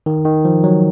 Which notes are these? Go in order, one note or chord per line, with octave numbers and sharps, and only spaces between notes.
D#3
D#3
F3
F#3